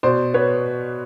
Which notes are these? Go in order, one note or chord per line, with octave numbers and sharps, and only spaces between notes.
B2 C5 D5
B3 B4 C#5